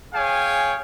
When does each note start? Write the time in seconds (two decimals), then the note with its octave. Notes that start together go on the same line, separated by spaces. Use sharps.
0.14 G#4 C#5 F5 G5 G#5